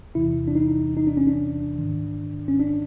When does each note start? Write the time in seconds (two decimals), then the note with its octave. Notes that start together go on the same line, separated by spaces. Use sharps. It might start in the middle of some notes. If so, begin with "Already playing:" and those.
0.15 E2 C3 E3 E4
0.48 D4
0.55 D#4
0.97 D#4
1.07 D4
1.17 C#4
1.27 D4
1.79 G#2 D#3
2.48 C#4
2.60 D4